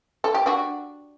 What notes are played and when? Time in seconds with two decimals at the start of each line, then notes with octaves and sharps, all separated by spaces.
0.24 A4
0.34 G4
0.46 D4 F#4